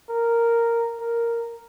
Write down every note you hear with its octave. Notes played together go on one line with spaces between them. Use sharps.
A#4
A#4